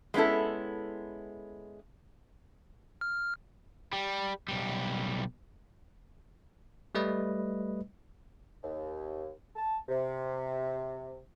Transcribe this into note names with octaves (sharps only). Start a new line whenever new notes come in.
G#3 B3 C#4 E4 A4
F6
G3
B1 G3
G3 A3 B4 D#5
D#2
A5
C3